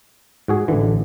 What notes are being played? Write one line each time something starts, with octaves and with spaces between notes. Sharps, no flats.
G#2 F#4 G#4
A1 D3 E3